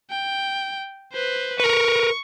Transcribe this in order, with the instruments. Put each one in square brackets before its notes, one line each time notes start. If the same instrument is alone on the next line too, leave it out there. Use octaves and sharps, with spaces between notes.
[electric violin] G5
B4 C5
[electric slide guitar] A#4 B4 [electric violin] C#6